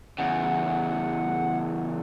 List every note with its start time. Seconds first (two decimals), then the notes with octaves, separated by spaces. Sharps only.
0.19 E2 C#3 F#5